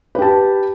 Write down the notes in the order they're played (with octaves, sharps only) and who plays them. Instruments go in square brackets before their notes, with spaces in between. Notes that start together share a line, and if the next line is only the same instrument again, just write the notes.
[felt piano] B4
G4
A5